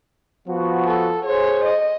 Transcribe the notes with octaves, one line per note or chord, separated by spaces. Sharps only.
F3 B3 F#4
A4
G#4 C5 C#5
D#5